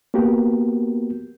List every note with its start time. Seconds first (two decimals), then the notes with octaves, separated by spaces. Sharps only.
0.14 A#3 B3 F#4 G4 A#4